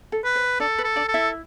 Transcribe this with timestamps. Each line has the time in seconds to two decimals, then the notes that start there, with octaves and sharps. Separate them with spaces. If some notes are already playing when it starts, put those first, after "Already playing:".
0.12 A4
0.24 B4
0.35 C5
0.60 D4 A4 D5
0.78 B4
0.84 A4
0.96 D4 D5
1.08 A4
1.14 E4 E5